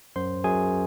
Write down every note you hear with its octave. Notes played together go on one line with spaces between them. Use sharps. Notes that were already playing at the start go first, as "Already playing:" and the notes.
F#2 C5 C6
F#2 G#4 G#5